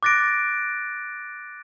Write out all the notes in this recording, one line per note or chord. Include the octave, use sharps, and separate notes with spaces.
D6 F#6 A6 A#6 D7